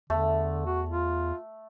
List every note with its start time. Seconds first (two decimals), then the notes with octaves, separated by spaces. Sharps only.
0.10 E2 D3 A3
0.66 F#4
0.89 F4